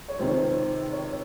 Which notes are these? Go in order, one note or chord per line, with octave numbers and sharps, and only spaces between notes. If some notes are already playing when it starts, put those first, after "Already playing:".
C#5
C#2 C3 D#3 C5
C#5